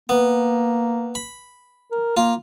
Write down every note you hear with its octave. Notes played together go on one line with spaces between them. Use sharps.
A#3 B3
B5
A#4
A#3 F4